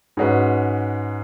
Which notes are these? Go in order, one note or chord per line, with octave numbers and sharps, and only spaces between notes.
G#2 G#3 C#4 F#4 B4